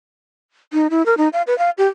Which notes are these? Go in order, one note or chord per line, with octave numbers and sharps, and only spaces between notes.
D#4
E4
A#4
D#4
F5
B4
F5
G4